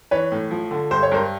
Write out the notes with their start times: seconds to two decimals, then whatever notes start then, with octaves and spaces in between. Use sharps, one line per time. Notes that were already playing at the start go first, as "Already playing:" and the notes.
0.11 E3 B4 C#5
0.32 A2
0.51 F3
0.71 D3
0.91 G2 C5
1.03 C#5
1.12 G2 A#4 C5